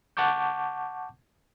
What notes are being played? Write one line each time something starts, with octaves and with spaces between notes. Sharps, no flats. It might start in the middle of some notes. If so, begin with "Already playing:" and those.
F#5 A5 C#6 D6 G6